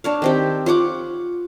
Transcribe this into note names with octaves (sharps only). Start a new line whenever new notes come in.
D4 C#5 F5
D#3 C4 G4
F4 C#5 F#5 D6